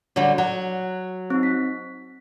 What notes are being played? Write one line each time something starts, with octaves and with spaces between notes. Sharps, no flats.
D3 F#3 G3 C#5
F#3
C4 D#4
B6